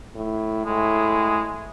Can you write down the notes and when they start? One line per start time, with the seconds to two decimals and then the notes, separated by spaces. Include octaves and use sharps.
0.15 A2
0.66 A2 G#3